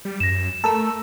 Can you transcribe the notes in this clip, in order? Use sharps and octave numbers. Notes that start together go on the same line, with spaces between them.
G3
F#2 A#6 E7
A3 A4 A#4 E6